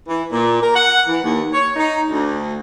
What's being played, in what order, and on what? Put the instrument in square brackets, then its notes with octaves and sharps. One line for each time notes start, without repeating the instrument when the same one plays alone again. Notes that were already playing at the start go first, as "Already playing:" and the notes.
[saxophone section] E3
A#2
A#4
F#5
E3
D#2
C#5
D#4
D2